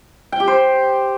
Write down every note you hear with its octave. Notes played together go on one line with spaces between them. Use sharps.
G5
G4
C5